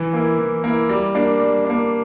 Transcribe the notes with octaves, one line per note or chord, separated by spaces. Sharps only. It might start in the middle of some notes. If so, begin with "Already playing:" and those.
Already playing: E3
A#3 E4
E3
A#3 E4
G3
A#3 D4
G3
A#3 D4